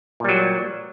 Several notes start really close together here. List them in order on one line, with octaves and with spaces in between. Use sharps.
A#2 G3 F#3